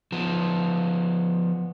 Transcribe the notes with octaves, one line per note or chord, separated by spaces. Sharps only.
F3 B3